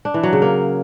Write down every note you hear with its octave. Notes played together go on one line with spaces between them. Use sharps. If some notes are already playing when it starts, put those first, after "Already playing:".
D4
E3
F#3
C#3
A#3